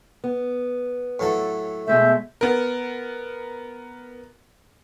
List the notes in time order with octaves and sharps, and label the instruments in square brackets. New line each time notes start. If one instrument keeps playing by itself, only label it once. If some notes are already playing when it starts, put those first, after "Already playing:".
[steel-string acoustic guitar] B3
[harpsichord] A2 F#3 A4
[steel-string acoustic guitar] B2 G#3 A3 [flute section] E5 G6
[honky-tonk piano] B3 A#4